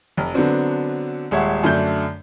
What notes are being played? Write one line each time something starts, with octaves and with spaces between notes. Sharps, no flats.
F1
D3 F#3 B3 C4 D4
D#1 G#3 C#5 E5 F#5
F#2 D3 A3 D4 G6